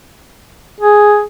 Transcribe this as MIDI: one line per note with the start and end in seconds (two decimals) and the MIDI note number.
0.81 1.23 68